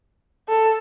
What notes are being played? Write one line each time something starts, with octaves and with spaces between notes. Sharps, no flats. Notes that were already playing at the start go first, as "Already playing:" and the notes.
A4